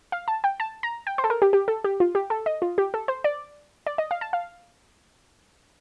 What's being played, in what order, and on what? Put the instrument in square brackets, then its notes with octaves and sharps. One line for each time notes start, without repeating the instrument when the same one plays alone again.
[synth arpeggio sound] F5
A5
G5
A5
A#5
G5
C5
A4
A#4
G4
G4
A4
G4
F4
G4
A4
D#5
F4
G4
A4
C5
D5
D5
D#5
F5
A5
F5